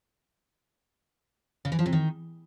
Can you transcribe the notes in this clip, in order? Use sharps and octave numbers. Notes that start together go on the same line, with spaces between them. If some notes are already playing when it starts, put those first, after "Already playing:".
C#3
E3
F3
C3
D#3